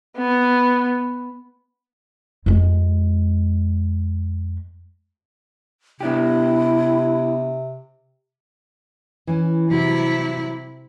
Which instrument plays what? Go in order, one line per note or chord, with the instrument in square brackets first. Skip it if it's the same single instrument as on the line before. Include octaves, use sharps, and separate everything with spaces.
[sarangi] B3
[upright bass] F2 G#3
[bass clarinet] C3 [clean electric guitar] B3 D4 G4 [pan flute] E4
[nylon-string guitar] E3 C#4
[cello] C3 E4 [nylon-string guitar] F#3 G3 F#4